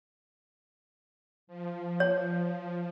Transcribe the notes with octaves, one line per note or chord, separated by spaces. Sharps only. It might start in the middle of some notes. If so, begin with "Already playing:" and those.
F3
C#5